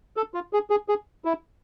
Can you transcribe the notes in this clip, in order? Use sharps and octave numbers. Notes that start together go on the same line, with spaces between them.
A4
F4
G#4
G#4
G#4
E4